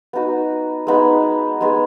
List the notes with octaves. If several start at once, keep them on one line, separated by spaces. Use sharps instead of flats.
B3 D#4 F#4
G#3 B3 D#4
G#3 B3 D#4